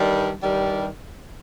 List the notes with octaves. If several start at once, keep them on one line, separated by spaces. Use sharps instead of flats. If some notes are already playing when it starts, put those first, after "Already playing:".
Already playing: G2 D#3 G3
G2 D#3 G3